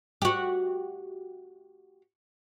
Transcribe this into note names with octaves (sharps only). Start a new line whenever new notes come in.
F#4 G4